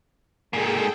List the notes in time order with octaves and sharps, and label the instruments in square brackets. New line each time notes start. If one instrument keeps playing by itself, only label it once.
[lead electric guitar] G#2 A#3 [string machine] G#4 A4 G5